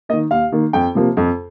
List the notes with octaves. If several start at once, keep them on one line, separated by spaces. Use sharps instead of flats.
D#3 A#3 D#5
D#2 F5
D#3 A#3
F2 G5
C3 F3 A#3
F2